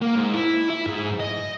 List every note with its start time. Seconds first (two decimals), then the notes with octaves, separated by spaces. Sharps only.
0.01 A#3
0.15 G#2
0.33 E4
0.70 E4
0.87 G#2
1.20 D#5